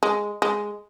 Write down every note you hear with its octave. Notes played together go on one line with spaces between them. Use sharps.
G#3
G#3